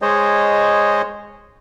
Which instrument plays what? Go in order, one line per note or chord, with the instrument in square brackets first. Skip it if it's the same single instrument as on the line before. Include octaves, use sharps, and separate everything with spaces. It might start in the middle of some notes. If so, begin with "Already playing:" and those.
[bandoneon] G#3 G#4 C5 C#5 D#5